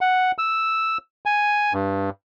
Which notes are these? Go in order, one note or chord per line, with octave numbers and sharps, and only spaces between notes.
F#5
E6
G#5
G2